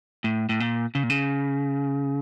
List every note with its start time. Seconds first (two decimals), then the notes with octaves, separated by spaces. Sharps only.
0.24 A2
0.49 A2
0.60 A#2
0.95 C#3
1.03 A#2
1.10 C#3